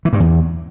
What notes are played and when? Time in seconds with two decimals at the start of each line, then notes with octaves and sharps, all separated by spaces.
0.05 E3
0.13 G2
0.20 E2